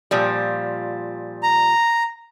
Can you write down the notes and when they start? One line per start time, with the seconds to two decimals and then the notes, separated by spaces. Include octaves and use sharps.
0.11 A#2 F3 G3
1.43 A#5